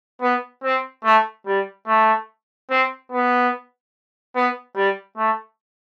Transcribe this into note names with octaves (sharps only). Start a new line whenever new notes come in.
B3
C4
A3
G3
A3
C4
B3
B3
G3
A3